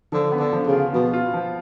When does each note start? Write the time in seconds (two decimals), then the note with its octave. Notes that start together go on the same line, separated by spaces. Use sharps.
0.12 D3 F3
0.32 B3
0.39 D3
0.52 F3
0.66 C#3
0.73 F4
0.93 B2 F3
1.14 F4
1.33 F3